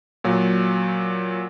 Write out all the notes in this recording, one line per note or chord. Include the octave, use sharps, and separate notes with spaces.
A#2 F#3